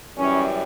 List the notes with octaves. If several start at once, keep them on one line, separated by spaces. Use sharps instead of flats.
F#2 E3 G3 C#4